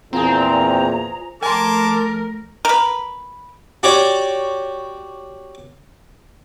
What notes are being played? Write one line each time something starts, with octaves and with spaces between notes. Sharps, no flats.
E2 A#2 F3 C4 G#4 A#5
F3 A3 A#4 G#5 A5 C6 D6
A#4 B4
F#4 G4 C#5 D5